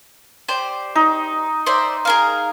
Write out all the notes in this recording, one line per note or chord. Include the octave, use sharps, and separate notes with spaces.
G4 C5 D5
D#4
C5 D5 E5
G#4 A#4 F5